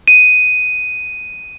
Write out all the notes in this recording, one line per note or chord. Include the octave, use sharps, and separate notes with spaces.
D#7